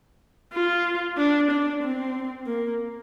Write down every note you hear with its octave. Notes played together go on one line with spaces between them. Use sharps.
F4
D4
D4
C4
A#3